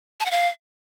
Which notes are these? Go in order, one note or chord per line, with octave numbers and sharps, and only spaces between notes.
A5
F#5
F5